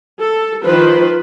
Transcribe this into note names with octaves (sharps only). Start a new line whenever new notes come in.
A4
D#3 F3 F4 B4 C5